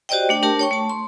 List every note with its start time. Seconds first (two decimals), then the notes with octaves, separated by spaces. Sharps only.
0.09 F#4 G4 C5 D5 D#5 G5
0.29 A3 D4 G5
0.43 D4 G4 A#4 A5
0.59 C#5 G5 C#6
0.71 A3 A5
0.90 C6